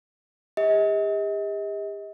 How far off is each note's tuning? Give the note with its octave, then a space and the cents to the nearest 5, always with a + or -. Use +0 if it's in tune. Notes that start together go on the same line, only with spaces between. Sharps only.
G4 +45 D#5 +40